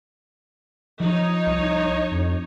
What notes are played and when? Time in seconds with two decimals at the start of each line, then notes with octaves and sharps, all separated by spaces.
1.00 F3 D#4 C#5
1.47 C2
2.11 F2